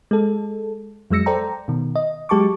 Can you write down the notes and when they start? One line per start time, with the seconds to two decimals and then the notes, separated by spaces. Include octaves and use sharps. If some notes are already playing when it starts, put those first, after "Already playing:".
0.11 G#3 A4
1.11 F2 F#3 G#3 E6 A#6 C#7
1.26 A4 C5 D5 G5 A#5
1.68 B2 D#3
1.96 D#5
2.29 F#3 G#3 G4 A5 C#6 D6